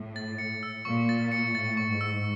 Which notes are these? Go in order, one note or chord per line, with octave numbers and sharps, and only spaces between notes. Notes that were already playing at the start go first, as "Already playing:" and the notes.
Already playing: A2
A6
C#7
E6
A#2 C#6
A6
C#7
A2 A6
C#6
G#2
E6